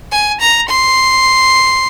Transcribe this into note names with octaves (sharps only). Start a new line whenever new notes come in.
G#5
A#5
C6